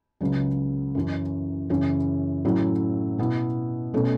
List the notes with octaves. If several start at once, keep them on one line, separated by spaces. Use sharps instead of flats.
C#2 C#3 F#3
F#2 E3 C#4
F#2 C#3 E3 C#4 E4
A2 F#3 C#4 E4
B2 B3 E4
B2 A3 C#4